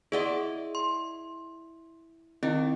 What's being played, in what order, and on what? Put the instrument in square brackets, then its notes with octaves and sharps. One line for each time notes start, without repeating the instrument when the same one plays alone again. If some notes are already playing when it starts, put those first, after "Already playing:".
[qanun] E4 D5 D#5 [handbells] G#4 F#5 C6
[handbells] C6
[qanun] D#3 [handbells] C4 E4